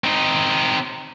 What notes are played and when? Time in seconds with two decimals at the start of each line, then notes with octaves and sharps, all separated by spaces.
0.04 C4 D#4